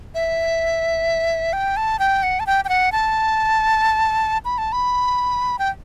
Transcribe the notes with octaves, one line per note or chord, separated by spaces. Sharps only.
E5
G5
A5
G5
F#5
A5
G5
G5
F#5
A5
B5
A5
B5
G5